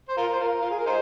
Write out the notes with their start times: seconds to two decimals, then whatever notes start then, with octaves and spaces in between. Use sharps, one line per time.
0.09 C5
0.17 F4 A#4
0.33 C5
0.40 F4 A#4
0.61 F4
0.70 G#4
0.79 A#4
0.86 D#4 G#4 C5